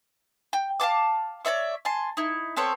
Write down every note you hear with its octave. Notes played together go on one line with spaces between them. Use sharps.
G5
F5 G5 A5 D6
C#5 D5 E5 C#6
G#5 A5 C6
D#4 E4
B3 C4 A4 C#5